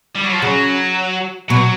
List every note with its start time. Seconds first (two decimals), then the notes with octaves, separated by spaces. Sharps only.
0.15 G3
0.24 F#3
0.32 F3
0.40 C#3 F#3
1.50 B2 F#3